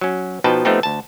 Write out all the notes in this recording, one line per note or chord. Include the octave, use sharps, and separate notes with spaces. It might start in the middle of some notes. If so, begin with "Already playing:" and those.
F#3 C#4
B2 F3 D#4 B4 G5 A5
F3 A3 B3 C4 D#4 G4
D2 A5